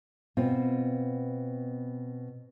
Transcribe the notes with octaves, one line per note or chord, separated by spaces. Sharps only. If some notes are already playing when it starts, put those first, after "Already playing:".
B2 C4 F4